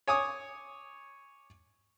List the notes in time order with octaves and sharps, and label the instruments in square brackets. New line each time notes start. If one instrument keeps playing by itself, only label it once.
[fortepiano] C#5 G#5 D6 D#6